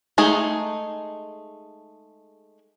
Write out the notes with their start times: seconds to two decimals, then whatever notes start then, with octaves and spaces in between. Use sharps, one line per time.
0.18 G#3 A3 D#4 G#4